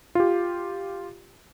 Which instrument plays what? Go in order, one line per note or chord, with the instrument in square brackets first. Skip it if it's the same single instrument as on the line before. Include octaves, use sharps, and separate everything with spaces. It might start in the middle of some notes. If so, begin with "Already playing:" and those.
[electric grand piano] F4 G4